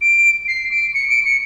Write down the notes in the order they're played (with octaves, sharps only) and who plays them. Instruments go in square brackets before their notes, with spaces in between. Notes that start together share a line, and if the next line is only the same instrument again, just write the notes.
[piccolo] D7
C7
D7
C#7
D7
C#7